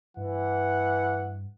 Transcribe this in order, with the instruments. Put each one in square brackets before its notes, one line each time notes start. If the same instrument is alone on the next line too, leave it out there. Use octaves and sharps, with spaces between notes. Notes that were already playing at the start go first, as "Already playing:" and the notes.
[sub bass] G2 [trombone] E3 [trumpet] F#5